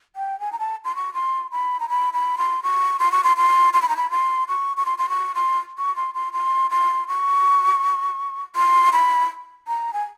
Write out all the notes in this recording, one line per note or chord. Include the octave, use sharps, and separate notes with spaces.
G5
G#5
A#5
A5
C6
C#6
C6
B5
A#5
B5
B5
C6
C#6
C6
C#6
C6
C6
C6
B5
A#5
B5
C6
C#6
C#6
C6
C6
C#6
C6
C#6
C6
C6
C6
C6
C#6
C6
B5
A#5
G#5